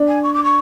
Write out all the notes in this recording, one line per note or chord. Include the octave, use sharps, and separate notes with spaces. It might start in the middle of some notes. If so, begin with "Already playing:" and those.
Already playing: D4
G#5
C#6
D6
C#6